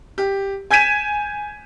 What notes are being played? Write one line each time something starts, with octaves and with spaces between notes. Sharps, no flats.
G4
G#5 G6 G#6 B6 D#7 E7